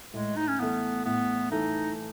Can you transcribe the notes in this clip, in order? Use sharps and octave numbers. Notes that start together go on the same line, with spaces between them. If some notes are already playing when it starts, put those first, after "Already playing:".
A2 G#3
D#4
C#4
E3 A3 B3
A2 B3
E3 A3 D#4